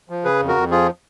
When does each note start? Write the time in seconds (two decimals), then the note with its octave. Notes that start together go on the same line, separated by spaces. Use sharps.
0.10 F3
0.24 C#3 G#4 B4
0.41 F2
0.48 F#4 A#4
0.56 F2
0.71 F3 F4 G#4